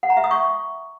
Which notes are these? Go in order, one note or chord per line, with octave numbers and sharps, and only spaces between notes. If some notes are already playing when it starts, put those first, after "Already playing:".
F#5
A#5
E5
D#6
C#6